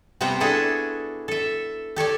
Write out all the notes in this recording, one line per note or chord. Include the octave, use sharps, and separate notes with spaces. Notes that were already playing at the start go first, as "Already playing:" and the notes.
C3 G3 B3 C5 F#5 G5
B3 D4 E4 F#4 G#4 A4
A4 E5
G4 A4 C#5 D5